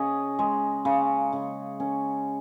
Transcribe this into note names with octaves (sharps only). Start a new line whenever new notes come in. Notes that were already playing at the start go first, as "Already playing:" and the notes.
Already playing: C#3 C#4 D#5
G#3
C#3
C#3
C#4